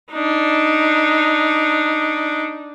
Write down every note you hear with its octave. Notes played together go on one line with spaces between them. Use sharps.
D4 D#4